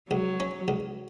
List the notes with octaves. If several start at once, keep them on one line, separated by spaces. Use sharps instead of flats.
C#2 F#3
C#4
C#2